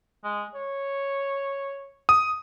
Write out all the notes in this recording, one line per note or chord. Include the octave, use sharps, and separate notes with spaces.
G#3
C#5
D#6